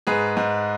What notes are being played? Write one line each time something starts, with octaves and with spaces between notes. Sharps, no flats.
G#2 G#4 B4
G#2